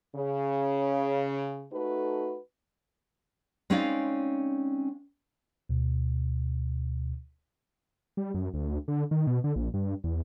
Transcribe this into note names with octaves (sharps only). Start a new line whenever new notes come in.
C#3
A3 D#4 F#4 A4 B4
G#3 C4 C#4 D#4 D5 F5
D2 B2
G3
F#2
D2
D3
D#3
B2
D3
A#1
G2
E2